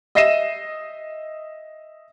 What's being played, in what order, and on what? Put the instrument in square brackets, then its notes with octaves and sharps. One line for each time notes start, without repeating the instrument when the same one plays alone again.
[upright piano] D#5 E5 A#6 C7 D#7 E7